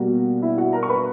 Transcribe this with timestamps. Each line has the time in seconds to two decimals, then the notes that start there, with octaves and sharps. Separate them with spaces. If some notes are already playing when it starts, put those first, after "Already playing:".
Already playing: B2 G3 A#3 F#4
0.42 E4 E5
0.57 F#4 F#5
0.73 A#4 A#5
0.83 C#6
0.89 B4 B5